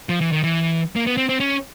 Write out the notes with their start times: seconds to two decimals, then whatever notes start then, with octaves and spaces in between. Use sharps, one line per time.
0.09 F3
0.21 E3
0.32 D#3
0.44 E3
0.96 A#3
1.07 B3
1.17 C4
1.29 C4
1.40 C#4